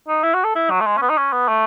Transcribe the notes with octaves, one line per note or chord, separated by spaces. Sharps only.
D#4
E4
F#4
A4
E4
F#3
A3
G#3
C#4
B3
D#4
C#4
B3
A3